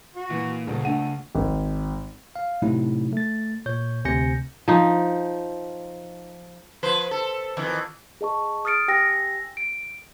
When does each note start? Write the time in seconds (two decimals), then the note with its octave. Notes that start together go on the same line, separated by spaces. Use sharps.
0.16 F#4
0.30 A#2 E3
0.67 D#1 C#2 C#3
0.85 A3 D4 F#5 D#7
1.35 G#1
2.36 F5
2.62 A2 C3 F#3 A3 D#4 E4
3.13 A3 A6
3.66 A#2 C#5 G6
4.05 D2 C3 G#5 G6 A#6 C#7
4.68 F3 D#4
6.83 F3 B4 C5
7.11 A4
7.57 F2 D#3 E3
8.21 G#4 D#5 A5 C#6
8.65 D#6 F6 A6 C#7 D7
8.88 G4 G5 G#5 E6 A#6
9.57 D7